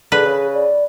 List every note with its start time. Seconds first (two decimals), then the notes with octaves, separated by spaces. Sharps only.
0.12 D3 G#4 B4
0.25 C#3
0.54 D5